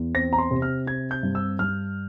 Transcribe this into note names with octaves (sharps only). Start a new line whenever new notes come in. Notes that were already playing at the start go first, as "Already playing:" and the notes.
Already playing: E2
C4 A#6
A#5
C6
C3
F6
C4 G#6
G6
G2
E6
G2 F6